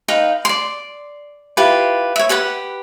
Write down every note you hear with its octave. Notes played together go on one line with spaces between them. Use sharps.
D#4 B4 F5 G5
D5 C6
E4 F4 G4 B4
C#5 E5
G4 B4 F#5 B5